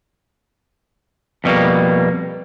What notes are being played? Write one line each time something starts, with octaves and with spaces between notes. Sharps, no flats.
F2 B2 G3 A#3